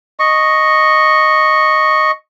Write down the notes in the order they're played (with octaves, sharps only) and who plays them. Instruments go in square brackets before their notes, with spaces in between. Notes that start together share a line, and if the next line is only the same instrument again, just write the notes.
[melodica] D#5 C#6